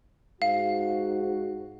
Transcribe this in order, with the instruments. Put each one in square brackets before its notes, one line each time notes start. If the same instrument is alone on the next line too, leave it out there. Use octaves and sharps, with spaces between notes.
[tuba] G#2 [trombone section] F#4 [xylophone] F5